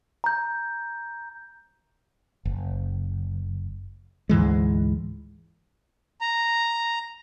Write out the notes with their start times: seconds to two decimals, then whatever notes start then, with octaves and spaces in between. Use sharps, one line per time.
0.24 A#5 G6
2.45 F#1
4.29 D2 G#2 E3 G#3
6.21 A#5